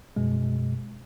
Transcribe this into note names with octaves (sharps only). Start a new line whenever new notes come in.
F#2 B2 G#3